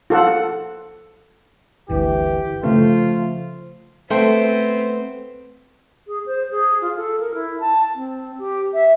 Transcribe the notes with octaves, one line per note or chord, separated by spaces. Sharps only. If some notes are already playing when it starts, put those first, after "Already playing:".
F4 A4 F#5
G1 D2 E3 D4 G4
C#3 F3 A3 C#4 F4
A3 B3 C4 C5 G5
G#4
C5
G#4
F4
A4
A#4
E4
A5
C4
G4
E5